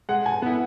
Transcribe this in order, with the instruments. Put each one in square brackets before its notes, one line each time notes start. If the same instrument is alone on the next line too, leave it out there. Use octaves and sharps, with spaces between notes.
[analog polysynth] G#3 [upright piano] F#5
[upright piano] G#5
[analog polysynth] B3 E4 [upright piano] F#5